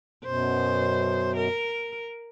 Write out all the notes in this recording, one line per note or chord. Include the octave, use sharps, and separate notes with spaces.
F#2 B2 C5
A#4